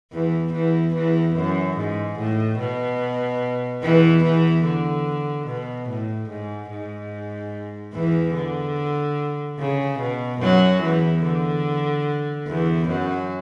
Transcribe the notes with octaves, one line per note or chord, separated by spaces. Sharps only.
E2 E3
E2 E3
E2 E3
F#2
G#2
A2
B2
E2 E3
E2 E3
D3
B2
A2
G#2
G#2
E2 E3
D3
C#3
B2
F#2 F#3
E2 E3
D3
E2 E3
F#2 F#3